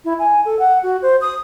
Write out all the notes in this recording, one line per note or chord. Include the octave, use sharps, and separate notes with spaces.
E4
G#5
A4
F#5
F#4
C5
D#6